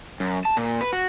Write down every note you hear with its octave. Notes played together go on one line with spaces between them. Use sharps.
F#2
A5
A#2
B4
F#4